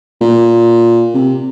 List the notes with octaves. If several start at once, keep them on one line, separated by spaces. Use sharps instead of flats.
A#2
C3